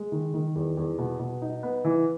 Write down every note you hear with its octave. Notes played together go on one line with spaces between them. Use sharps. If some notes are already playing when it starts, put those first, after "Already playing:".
Already playing: G#3
D#3
D#3
E2
E2
B2
B2
D#4
B3
E3